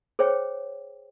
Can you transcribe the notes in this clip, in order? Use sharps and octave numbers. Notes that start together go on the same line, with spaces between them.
G#4 C5 C#5 G5